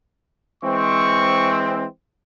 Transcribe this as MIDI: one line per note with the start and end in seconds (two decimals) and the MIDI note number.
0.64 1.85 52
0.64 1.85 56
0.64 1.85 60
0.64 1.61 85